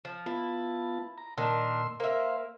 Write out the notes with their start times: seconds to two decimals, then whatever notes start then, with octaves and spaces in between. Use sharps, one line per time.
0.05 F3
0.26 B3 E4 F4 A5
1.18 A#5
1.38 A#2 D#3 D4 C6 E6
2.00 A#3 C5 E5 F5